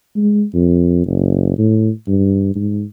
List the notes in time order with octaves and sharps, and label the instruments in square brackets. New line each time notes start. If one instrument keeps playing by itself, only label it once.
[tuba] G#3
F2
F#1
A2
G2
G#2